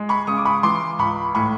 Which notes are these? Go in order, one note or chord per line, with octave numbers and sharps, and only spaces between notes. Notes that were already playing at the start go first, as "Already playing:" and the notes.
Already playing: G#3
B5 C#6
C#3 C#6 D#6
D6
B5 C#6
E3 C6 D6
C#2 B5 C#6
A2 B5 C#6